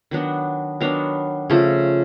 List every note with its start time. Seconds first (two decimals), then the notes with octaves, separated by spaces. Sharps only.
0.11 D#3 F#3 B3 D4
0.81 D#3 F#3 B3 D4 F5
1.50 C#3 F3 A3